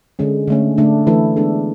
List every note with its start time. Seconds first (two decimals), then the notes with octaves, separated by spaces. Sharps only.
0.19 D3 G#3 C#4
0.47 D3 A3 C#4
0.78 D3 A3 D4
1.07 E3 A3 E4 A4
1.37 G#3 B3 D4 A4